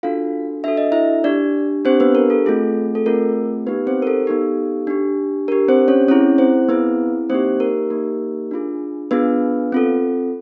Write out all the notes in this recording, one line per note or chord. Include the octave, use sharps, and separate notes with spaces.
D4 F4 F#4 A4 F5
D4 F#4 A4 E5
D#5
E4 E5
D4 G4 D5
C4 D4 G4 C5
B3 B4
A#4
A4
A3 C4 F4 G#4
A4
A3 C4 F4 G#4 A#4
B3 D#4 G4 B4
C4 C5
A#4
A4
B3 D#4 G4
D4 G4
D4 G4 A#4
C4 C5
C#4 C#5
C4 C#4 E4 G#4 C#5
C4 C5
B3 C4 E4 G#4 B4
A#3 C4 D#4 G4 C5
A#4
A#3 D#4 G4
D4 F4 G#4
B3 D4 F4 G#4 B4
C4 F4 A4